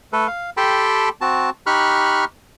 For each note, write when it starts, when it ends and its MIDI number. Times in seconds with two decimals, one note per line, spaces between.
0.13 0.27 57
0.13 0.27 69
0.13 0.27 71
0.27 0.50 77
0.57 1.09 67
0.57 1.09 69
0.57 1.09 79
0.57 1.09 81
0.57 1.09 83
0.57 1.09 84
1.21 1.50 60
1.21 1.50 66
1.21 1.50 81
1.66 2.25 63
1.66 2.25 67
1.66 2.25 83
1.66 2.25 85
1.66 2.25 89
1.66 2.25 90